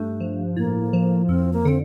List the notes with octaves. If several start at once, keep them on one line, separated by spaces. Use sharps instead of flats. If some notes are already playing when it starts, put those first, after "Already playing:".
Already playing: G2 A3
F3
A2 A#3
F3
F2 C4
A#3
D3 C4